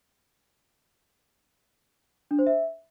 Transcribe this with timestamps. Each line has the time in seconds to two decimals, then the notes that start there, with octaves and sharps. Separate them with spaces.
2.31 D4
2.39 C5
2.47 E5